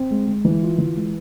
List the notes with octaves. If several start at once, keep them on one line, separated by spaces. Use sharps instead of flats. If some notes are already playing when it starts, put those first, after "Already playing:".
Already playing: C4
G#3
G#3
E3
F4
E3
G#3